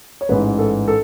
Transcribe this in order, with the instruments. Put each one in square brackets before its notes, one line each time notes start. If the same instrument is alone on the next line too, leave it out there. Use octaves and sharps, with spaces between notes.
[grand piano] C#5
A1 G#2 E3 B4
A4
A4